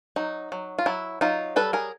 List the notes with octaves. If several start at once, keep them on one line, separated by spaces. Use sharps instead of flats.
F#3 D#4
F#3
F4
F#3 E4
F#3 D#4 F4
G3 A4 B4
G#4 A#4